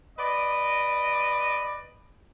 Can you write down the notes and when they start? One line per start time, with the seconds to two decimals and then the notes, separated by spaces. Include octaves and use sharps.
0.18 B4 D5 D#5